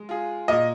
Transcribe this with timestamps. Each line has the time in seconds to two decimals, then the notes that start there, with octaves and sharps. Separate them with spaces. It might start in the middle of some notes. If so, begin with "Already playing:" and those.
Already playing: G#3
0.09 F4 G#4
0.48 A#2 D#5